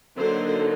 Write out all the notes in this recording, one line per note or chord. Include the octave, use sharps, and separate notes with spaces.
D3 F#3 A#3 D#4 C5